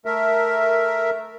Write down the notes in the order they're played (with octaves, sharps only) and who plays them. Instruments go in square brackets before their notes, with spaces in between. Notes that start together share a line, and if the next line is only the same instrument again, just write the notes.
[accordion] A3 A#4 E5